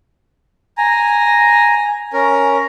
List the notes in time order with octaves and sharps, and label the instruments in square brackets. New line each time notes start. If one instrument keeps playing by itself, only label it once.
[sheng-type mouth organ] G#5 A#5
C#4 A#4